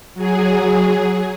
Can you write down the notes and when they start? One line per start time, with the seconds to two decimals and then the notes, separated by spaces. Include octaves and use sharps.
0.14 F#3 G#4